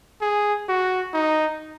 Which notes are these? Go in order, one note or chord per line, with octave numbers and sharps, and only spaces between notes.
G#4
F#4
D#4